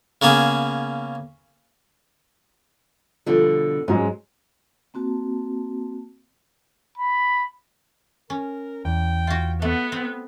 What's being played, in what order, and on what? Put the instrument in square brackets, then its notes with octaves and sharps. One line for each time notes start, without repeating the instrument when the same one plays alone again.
[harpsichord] C#3 A#3 B3 G#4
[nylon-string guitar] B2 D3 G3 [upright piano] F3
[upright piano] G#2 F#3 G#3 [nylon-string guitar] C#4
[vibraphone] A#3 C4 F#4 A5
[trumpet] B5
[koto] C#4 [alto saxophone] A#4
[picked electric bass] E2 [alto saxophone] G5
[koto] F4 F#4
[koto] A3 [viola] B3 [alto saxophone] F#5
[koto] C4